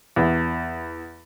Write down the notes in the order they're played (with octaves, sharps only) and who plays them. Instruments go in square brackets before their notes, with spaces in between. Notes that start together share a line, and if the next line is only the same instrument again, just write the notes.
[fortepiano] E2